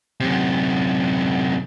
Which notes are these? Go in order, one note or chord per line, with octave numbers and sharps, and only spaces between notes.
F#2 C3